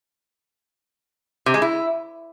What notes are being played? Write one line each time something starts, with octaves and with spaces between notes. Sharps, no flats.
C3
G#3
E4